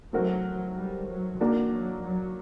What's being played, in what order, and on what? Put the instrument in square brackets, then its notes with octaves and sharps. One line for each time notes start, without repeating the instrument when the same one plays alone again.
[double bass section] F#3 [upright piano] A3 C4 F#4 A#4
[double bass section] G3
F#3
[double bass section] D#3 [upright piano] A#3 D4 F#4
[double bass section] F#3
F#3